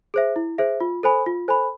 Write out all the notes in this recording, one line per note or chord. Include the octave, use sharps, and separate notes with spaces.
G#4 C5 E5
E4
G#4 C5 E5
F4
A4 C5 G#5 B5
F4
A4 C5 G#5 B5